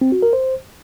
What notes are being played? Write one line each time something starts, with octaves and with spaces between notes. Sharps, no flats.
C4
F#4
A#4
C5